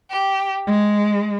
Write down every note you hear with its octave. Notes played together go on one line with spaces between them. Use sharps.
G4
G#3